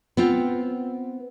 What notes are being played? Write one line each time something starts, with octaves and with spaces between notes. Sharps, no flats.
B3 C4 F4